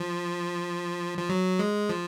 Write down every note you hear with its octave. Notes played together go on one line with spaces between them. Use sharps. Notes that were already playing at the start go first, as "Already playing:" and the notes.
Already playing: F3
F3
F#3
G#3
F3